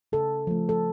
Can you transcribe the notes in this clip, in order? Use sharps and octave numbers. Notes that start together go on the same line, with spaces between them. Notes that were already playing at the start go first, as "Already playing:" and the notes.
C#3 A4
F3 A3
A4